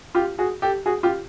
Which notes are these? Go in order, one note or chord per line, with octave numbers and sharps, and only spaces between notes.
F4 G4
F#4 G#4
G4 A4
F#4 G#4
F4 G4